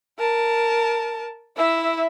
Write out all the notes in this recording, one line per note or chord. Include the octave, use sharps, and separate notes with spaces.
A#4 A5
E4 E5